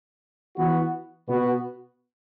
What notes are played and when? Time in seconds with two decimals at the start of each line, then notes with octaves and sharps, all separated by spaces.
0.57 E3 B3 F#4
1.28 B2 B3 F#4